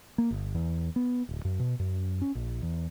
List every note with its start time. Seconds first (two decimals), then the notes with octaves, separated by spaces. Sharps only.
0.18 A#3
0.31 G1
0.55 E2
0.96 B3
1.29 D1
1.45 F#2
1.59 B2
1.79 F#2
2.22 C#4
2.35 A#1
2.62 E2